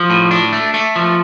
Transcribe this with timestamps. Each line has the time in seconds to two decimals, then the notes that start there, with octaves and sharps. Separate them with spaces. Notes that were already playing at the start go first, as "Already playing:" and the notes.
Already playing: F3
0.10 A2
0.31 D4
0.53 A3
0.74 A3
0.96 F3